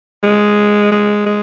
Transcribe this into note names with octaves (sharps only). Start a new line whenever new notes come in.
G#3
G#3
G#3